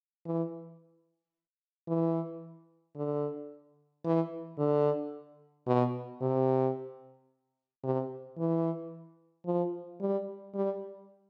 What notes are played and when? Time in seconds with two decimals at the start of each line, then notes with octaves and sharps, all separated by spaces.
0.26 E3
1.88 E3
2.96 D3
4.05 E3
4.58 D3
5.67 B2
6.21 C3
7.84 C3
8.38 E3
9.46 F3
10.01 G3
10.55 G3